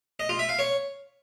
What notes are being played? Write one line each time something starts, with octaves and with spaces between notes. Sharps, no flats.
D#5
F4
E5
F5
C#5